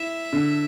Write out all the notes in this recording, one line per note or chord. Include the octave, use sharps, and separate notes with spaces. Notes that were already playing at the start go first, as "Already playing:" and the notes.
Already playing: E4 E5
D3